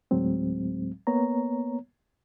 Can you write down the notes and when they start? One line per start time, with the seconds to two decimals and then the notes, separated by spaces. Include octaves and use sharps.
0.11 D2 A2 F#3 G#3 C4
1.07 A#3 B3 C#5 A#5